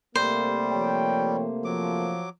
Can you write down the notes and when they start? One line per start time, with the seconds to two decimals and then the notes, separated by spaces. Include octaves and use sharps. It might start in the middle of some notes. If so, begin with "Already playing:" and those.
0.15 C3 G3 A3 A#3 C5
0.72 F3 C#5 G5
1.65 F3 F#3 D6